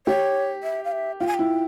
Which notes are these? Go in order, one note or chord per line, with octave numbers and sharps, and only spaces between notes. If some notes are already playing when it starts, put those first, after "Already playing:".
G4 C#5
E5
F5
E5
F4 G5
G#5
E4 G5